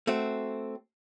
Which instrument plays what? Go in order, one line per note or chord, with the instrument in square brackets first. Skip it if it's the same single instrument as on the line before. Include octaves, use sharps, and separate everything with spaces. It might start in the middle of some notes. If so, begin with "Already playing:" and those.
[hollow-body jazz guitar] A3 C4 F#4